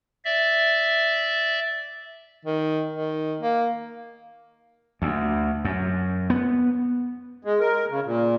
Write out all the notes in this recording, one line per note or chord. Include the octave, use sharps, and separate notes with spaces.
D5 E5
D#3
D#3
A#3
D2
F#2
B3
G#3
A#4
C#3
A#2